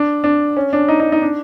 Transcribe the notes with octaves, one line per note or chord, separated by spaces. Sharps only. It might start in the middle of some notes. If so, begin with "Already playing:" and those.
Already playing: D4
D4
C#4
D4
D#4
D#4
D#4
D4